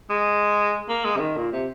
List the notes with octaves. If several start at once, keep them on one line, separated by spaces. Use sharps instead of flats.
G#3
A#3
G#3
C3
D#3
A#2
C3